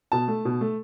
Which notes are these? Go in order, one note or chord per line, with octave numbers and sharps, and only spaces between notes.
B2 A5
A3
B2
A3